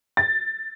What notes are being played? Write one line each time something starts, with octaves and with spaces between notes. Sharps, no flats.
A6